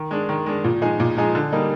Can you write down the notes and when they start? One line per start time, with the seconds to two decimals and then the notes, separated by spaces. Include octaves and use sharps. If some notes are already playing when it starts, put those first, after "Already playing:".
Already playing: D#3
0.11 G#3 D4
0.29 D#3
0.46 G#3 D4
0.64 A#2
0.81 F3 G#3 D#4 G#4
1.00 A#2
1.17 F3 G#3 D#4 G#4
1.35 D3
1.52 G3 A#3 D#4